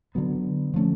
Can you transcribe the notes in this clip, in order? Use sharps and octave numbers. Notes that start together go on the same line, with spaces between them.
D3 F#3 B3
F3 A3 C#4